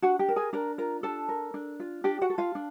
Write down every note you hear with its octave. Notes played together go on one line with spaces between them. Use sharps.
D4 F#4 F#5
G4 G5
A#4
G#4 G#5
D4 A#4 A#5
F4 A#4 A#5
D4 A4 A5
A#4
D4
F4
D4 G4 G5
F#4 F#5
A4
F4 F5
D4